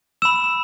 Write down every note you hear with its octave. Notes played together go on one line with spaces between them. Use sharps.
B5 E6 E7